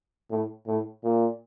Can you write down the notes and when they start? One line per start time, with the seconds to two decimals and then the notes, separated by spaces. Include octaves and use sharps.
0.30 A2
0.67 A2
1.03 A#2